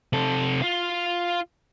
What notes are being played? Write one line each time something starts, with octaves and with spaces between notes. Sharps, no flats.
C3 A4
F4 F5